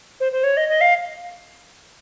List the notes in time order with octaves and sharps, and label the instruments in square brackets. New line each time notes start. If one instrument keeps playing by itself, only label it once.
[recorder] C5
C5
C#5
D#5
D#5
F5